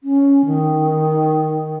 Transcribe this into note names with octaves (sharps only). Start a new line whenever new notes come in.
C#4
D#3